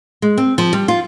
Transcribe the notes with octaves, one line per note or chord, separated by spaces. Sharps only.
G#3
C4
F3
G3
F4